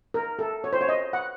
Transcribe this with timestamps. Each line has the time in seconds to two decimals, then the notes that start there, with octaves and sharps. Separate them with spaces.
0.14 A#4
0.39 A4
0.64 C#5
0.73 C5
0.81 C#5
0.89 D#5
1.13 F#5